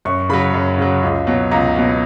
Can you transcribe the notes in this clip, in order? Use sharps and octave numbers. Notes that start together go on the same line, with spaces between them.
F#2 C#6
C#3 F#3 B5
F#2
C#3 F#3
C#2
B2 F#3
C#2 A#5
B2 F#3